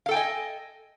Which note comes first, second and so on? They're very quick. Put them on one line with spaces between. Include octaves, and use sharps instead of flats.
F5 A4 G5 G#5 D#5